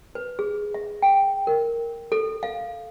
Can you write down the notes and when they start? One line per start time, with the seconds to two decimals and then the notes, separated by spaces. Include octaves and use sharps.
0.15 B4
0.39 G#4
0.74 E5
1.02 G5
1.47 A#4
2.12 A4
2.43 F5